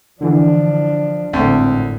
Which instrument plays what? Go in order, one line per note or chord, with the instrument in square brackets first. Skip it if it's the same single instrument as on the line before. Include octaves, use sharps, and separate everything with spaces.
[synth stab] D3 E3 [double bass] F3 D4
[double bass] G#1 A2 [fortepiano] D2 [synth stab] C4